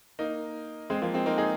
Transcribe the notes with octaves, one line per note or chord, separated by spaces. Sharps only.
A#3 D#4
G#3 C4
F3 A#3
G#3 C4
A#3 D#4
D#4 G#4